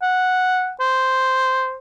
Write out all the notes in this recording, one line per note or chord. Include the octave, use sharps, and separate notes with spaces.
F#5
C5